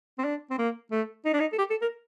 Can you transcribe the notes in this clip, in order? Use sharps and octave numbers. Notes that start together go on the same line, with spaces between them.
C4
D4
C4
A#3
A3
D#4
D4
D#4
A4
G4
A4
A#4